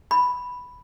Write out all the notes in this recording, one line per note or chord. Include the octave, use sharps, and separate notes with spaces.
B5